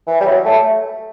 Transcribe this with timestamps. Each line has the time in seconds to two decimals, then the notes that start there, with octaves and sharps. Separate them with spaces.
0.07 E3
0.21 G3
0.26 F#3
0.45 A3